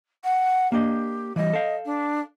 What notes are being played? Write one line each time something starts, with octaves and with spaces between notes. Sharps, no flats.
F#5
A#3 D4 G4 D#5
E3 G3 D#5
A4 F5
D4